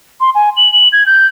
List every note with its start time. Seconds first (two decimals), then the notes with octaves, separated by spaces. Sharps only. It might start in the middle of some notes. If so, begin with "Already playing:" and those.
0.20 C6
0.35 G#5
0.57 F#7
0.73 F#7
0.92 G#6
1.06 G6